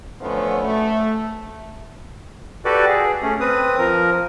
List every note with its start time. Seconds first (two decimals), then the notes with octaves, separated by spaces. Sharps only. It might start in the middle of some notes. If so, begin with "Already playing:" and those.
0.21 D3 F3 F#3 A3 B3 C#4
0.64 A3
2.65 F#4 G4 A4 B4 D5
2.88 G#4
3.22 A3 C#4
3.40 C4 B4 D#6
3.78 F3 A#4